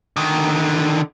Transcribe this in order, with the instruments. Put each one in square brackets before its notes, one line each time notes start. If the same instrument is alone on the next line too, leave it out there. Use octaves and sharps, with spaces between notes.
[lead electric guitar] D3 D#3